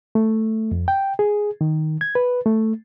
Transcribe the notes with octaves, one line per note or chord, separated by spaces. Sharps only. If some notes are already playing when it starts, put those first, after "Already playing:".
A3
F2
G5
G#4
D#3
G#6
B4
A3